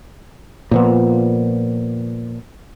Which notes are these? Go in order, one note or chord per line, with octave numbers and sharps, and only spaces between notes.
A#2 F3 B3